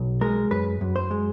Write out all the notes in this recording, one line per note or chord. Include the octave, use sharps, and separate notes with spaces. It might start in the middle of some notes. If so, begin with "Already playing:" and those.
Already playing: B1
G#3 A#4
F#2 B4
F#2
C5
G#3